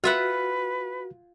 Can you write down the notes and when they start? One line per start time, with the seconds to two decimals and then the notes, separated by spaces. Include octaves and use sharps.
0.04 F4 F#4 B4 E5 F#5